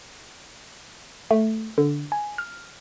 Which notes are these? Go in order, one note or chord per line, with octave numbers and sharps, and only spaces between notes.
A3
D3
G#5
F6